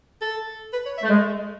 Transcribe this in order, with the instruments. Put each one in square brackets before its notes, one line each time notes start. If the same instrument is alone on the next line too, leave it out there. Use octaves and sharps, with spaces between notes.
[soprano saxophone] A4
B4
C#5
E5
[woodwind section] A3
G#3